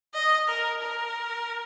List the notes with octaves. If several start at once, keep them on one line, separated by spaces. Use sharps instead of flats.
D#5
A#4
A#4